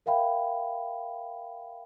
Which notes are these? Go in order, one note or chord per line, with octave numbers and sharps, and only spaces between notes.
A#4 E5 F5 G5 B5